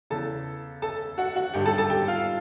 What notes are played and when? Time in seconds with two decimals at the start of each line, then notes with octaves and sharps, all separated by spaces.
0.10 E2 C#3 E3 A4 A5
0.82 A4 A5
1.18 F#4 F#5
1.36 F#4 F#5
1.54 G#1 G2 D3 G4 G5
1.66 A4 A5
1.78 A4 A5
1.90 G4 G5
2.08 F4 F5